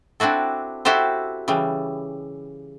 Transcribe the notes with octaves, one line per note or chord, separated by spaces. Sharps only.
C4 D4 E4 F#4 A4
E4 F#4 G4 A4 C5
C#3 E3 G3